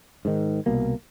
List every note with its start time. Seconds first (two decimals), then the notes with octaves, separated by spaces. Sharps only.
0.25 G#2 D#3
0.66 C2 B2 A#3